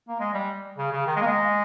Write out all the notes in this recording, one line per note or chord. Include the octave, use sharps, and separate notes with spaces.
A#3
G#3
G3
C#3
C#3
D#3
G#3
A#3
G#3